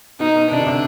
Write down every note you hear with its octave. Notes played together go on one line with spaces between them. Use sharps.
B2 D#4
B2
C3 D4
D3
C3